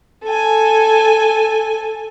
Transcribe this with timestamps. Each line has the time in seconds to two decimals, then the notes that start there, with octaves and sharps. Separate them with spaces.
0.24 A4 G#5